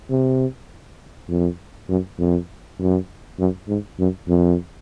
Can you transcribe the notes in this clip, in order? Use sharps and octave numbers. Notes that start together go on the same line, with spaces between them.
C3
F2
F#2
F2
F#2
F#2
G#2
F#2
F2